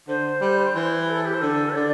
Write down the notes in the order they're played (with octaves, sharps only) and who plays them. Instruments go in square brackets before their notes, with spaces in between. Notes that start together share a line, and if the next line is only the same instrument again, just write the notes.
[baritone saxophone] D3 [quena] C5
[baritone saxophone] G3
E3
[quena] A4
G4
C5
[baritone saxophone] D3 [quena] A4
[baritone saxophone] D3 [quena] D5